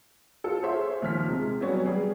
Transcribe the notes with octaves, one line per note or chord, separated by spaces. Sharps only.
F4 A4
G#4 C5 C#5 E5 C6
D#2 F3 F6 B6
C3 G#3
F#3 G3 B3 C#4 C#5
G3 G#4